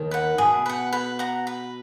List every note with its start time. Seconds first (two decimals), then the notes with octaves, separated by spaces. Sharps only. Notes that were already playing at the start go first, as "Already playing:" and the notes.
Already playing: D#2 D#3
0.11 B4 F#5
0.38 B2 G#4
0.66 B4 F#5
0.93 B4
1.19 F#5 A#5
1.47 B4